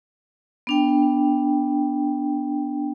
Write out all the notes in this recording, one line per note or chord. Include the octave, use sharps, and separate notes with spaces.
B3 D4 G5